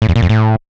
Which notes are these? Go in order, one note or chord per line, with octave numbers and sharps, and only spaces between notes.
A2
E2
A#2
F2
A2